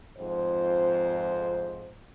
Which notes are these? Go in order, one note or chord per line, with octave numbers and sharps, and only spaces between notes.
F2 G#2 C5